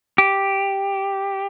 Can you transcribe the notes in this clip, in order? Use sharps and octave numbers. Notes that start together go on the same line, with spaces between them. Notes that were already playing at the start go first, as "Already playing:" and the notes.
G4